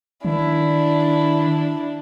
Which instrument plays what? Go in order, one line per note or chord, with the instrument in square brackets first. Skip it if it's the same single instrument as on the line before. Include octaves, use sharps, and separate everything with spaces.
[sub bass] D#3 [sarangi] D4 [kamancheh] E4